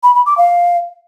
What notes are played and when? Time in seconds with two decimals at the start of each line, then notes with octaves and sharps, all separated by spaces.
0.03 B5
0.15 B5
0.26 D6
0.38 F5